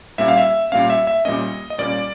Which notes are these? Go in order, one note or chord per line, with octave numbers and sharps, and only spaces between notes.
A#2 G3 A#3 C#4 E5
F5
E5
A#2 G3 A#3 C#4 F5
E5
E5
A#2 G3 A#3 C#4 D#5
D#5
A#2 G3 A#3 C#4 D5